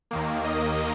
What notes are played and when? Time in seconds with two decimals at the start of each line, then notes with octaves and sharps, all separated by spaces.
0.11 D#2 D#3 A#3
0.44 D#5